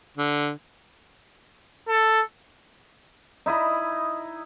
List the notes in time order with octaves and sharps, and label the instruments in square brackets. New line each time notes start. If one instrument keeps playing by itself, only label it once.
[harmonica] D3
[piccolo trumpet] A4
[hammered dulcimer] D#4 E4 D#5 B5